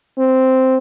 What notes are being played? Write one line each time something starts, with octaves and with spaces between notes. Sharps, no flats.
C4